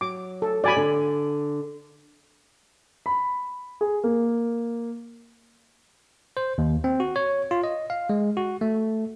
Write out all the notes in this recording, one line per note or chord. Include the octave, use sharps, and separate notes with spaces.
F#3 D6
A4
F#3 F#4 D5 G#5 B5
D3
B5
G#4
A#3
C5
D#2
C4
F#4
C#5
F4
D#5
F5
G#3
F#4
A3